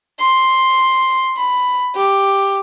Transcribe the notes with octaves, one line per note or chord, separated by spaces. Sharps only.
C6
B5
G4